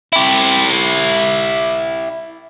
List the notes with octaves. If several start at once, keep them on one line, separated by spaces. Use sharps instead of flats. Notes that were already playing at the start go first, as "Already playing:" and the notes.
E4 G4